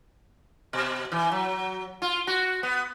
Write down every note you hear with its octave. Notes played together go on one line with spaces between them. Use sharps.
B2
E3
F#3
F4
F#4
B3